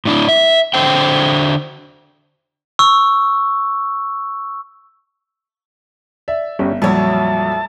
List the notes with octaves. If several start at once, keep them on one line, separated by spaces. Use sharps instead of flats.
A2 D4 E4
E5
D3 C5 G5
C#6 E6
D5 E5
G1 G3 C#4 E5
F2 A#2 F#3 G3 E4 C#5 A5